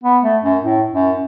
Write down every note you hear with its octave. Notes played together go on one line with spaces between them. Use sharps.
B3
A3
F#2
A2
F#2